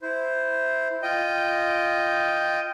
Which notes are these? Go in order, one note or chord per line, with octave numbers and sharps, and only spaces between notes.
E4 C5
F4 D#5 G5